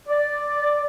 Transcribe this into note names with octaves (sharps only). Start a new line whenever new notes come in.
D5